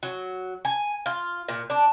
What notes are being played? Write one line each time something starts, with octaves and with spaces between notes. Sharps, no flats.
F#3
G#5
F4
A#2
D4